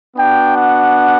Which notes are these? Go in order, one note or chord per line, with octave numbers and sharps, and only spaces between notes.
B3 D4 F#4 G5
F#5